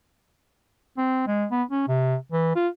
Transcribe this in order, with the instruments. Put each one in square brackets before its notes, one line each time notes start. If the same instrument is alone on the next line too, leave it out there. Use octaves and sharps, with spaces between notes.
[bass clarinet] C4
G#3
B3
C#4
C3
E3
F4